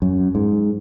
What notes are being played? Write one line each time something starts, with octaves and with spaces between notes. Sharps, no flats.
F#2
G#2